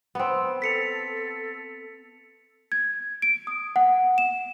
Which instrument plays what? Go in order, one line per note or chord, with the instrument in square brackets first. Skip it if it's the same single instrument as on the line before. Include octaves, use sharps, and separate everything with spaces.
[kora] B3 C4
[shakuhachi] A4 [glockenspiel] B6 C#7 F7
[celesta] G#6
D7
D#6
F#5
E7